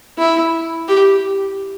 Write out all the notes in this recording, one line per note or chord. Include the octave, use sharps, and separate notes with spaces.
E4
G4